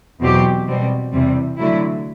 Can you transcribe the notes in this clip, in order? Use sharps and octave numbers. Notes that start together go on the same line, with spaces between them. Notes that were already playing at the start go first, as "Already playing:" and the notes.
E2 B2 F#3 C4 G4
B2 G3 C4
E2 C3 E3 G3 C4
D3 F#3 A3 E4